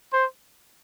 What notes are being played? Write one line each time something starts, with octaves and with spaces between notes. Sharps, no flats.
C5